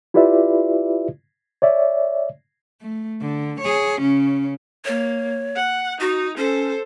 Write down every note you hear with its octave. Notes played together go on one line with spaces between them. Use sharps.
E4 F4 G4 B4 D5 E5
C#5 D5 E5
A3
D3
G#4 C#5
C#3 C#4
A#3 C#5
F#5
D#4 F#4
C#4 A4 C5